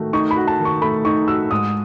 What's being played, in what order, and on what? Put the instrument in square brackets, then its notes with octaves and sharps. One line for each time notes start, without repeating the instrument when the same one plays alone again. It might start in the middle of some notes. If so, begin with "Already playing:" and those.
Already playing: [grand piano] D#3 A3 F#4
[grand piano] D#4 [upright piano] C#6
[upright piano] B5
[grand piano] F#4
[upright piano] A5
[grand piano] D#3
[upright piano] C#6
[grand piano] A3 [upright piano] B5
[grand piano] D#4 [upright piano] C#6
[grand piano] F#4 [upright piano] E6
[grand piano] G#2 [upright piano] D#6